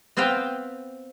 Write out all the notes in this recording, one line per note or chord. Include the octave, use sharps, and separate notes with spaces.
B3 C4 B4 C5 F5 G5